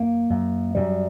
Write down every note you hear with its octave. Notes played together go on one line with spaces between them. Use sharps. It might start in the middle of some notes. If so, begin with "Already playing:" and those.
Already playing: F#2 A#3
F#2
F#2 G3